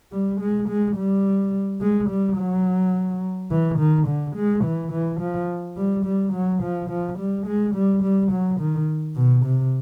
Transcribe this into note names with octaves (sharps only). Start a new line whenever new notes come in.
G3
G#3
G#3
G3
G#3
G3
F#3
E3
D#3
D3
G#3
E3
E3
F3
G3
G3
F#3
F3
F3
G3
G#3
G3
G3
F#3
D#3
B2
C3